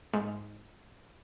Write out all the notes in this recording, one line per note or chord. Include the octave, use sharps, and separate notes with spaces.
G#2